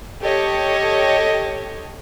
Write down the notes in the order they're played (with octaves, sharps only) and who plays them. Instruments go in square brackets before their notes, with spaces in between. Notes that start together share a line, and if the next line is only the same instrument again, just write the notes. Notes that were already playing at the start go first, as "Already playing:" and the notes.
[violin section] G4 A4 C#5 D#5